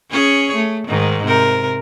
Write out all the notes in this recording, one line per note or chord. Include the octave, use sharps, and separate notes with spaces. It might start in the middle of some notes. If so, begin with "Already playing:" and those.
C#4 G#4 C#5
A3
G#2 D#3
C3 A#4